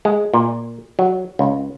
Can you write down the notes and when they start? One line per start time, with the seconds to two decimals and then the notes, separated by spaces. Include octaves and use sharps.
0.05 G#3
0.34 A#2
0.99 F#3
1.39 C#2